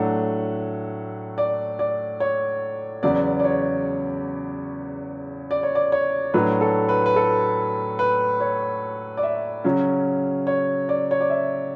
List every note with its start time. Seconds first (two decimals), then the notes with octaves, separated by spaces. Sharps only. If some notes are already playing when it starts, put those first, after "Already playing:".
Already playing: A2 F#3 A3 D4 F#5
1.38 D5
1.79 D5
2.20 C#5
3.03 E2 C#3 F#3 B3 D5
3.39 D5
3.44 C#5
5.51 D5
5.63 C#5
5.75 D5
5.92 C#5
6.34 A2 F#3 A3 D4 B4
6.61 A4
6.89 B4
7.06 B4
7.16 A4
7.99 B4
8.40 C#5
9.17 D5
9.23 E5
9.64 C#3 F#3 C#4
10.47 C#5
10.89 D5
11.11 C#5
11.21 D5
11.30 E5